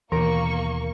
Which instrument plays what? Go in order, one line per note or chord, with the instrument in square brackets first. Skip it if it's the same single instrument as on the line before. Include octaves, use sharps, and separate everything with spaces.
[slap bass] D#2 B2 [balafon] E3 [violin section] A#3 C#6 [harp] A#4